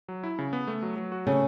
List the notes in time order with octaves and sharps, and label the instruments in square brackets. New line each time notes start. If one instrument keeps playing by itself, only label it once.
[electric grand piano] F#3
E4
C#3
B3
A3
F#3
F#3
F#4
[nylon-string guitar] C#3 [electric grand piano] A3